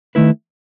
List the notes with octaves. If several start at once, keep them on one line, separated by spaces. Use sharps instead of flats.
D#3 A3 E4 B4